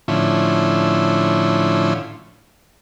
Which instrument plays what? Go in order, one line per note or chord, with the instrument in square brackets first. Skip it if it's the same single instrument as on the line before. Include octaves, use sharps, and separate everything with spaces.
[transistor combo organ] A2 D3 F3 C#4 E4